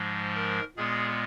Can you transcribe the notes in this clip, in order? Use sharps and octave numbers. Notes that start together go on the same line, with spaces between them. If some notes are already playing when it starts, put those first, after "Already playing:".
Already playing: G#2 F3 G#3
A#4
A#2 G#3 B3 G#4